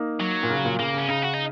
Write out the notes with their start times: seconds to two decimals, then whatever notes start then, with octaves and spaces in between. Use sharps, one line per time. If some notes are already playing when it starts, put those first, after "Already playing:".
Already playing: A#3 D#4
0.20 F#3
0.43 A#2
0.50 C#3
0.65 A#2
0.79 C#3 A#3
0.93 C#3
0.98 C#4
1.09 C#3 D#4
1.23 F#4
1.34 D#4